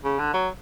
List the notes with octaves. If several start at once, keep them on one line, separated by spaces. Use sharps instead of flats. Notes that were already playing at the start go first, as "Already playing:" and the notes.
C#3
D3
F#3